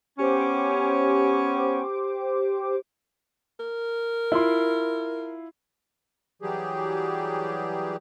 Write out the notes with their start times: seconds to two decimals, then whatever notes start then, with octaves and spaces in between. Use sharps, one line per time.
0.19 B3 C#4 G4 C5 D6
3.59 A#4
4.32 E4 F4 C6
6.42 E3 F#3 G3 G4 G#4